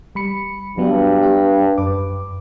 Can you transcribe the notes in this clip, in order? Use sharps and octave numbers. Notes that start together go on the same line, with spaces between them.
G3 B5 C#7
G2 F#3 B3 F#4
G4
F#2 B4 D6